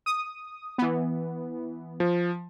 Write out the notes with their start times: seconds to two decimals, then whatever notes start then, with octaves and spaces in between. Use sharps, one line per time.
0.06 D#6
0.78 E3 B3
2.00 F3